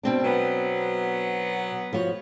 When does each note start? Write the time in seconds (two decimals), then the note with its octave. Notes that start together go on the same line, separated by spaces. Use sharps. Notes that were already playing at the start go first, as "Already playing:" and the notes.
0.03 B2 C4 D4
0.24 F#3 B3
1.93 F3 F#4 C#5